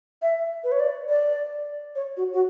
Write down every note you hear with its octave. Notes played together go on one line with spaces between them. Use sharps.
E5
B4
C#5
D5
D5
C#5
F#4
F#4